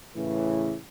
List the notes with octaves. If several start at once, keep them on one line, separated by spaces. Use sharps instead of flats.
A2 C#3 E3